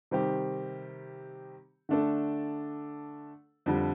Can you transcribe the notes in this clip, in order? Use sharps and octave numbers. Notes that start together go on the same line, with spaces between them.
C3 D#3 G3 C4 G4
D3 A3 D4 A4
F2 D3 G3